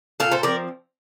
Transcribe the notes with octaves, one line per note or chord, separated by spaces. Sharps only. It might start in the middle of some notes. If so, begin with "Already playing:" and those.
A#2 F4 A4
A4 C5
F3 C4 A#4 D5